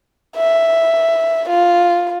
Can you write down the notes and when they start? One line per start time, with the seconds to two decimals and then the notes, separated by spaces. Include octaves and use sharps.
0.36 E5
1.49 F4